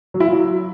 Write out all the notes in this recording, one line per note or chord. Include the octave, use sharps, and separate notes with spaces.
F#3
E4
F4
F#3